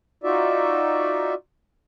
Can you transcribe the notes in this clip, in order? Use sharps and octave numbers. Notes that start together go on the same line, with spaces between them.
D#4 F4 F#4 D5 E5